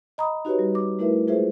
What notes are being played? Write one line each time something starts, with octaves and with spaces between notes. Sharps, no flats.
D#5 A#5 B5 D#6
D#4 F#4 G4 B4 C#5
G3
D6
A3 E4 A#4 B4 E5
G#3 F4 G#4 B4 C5 E5